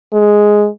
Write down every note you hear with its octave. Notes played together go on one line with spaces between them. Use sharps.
G#3